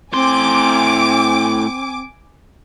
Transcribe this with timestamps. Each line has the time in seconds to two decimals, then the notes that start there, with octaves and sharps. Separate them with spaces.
0.13 A2 C4 G#5 C6 D6